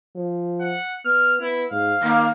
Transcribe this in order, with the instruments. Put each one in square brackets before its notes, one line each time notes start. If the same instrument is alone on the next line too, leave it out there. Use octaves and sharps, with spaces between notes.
[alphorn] F3
[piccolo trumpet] F#5
[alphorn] B3 [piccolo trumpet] F6
[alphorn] B3 [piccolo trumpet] E4
[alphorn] G#2 [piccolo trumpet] F5
[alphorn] D#3 [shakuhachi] A#3